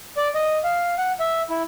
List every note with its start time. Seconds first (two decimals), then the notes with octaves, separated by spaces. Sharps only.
0.17 D5
0.35 D#5
0.64 F5
0.98 F#5
1.20 E5
1.50 E4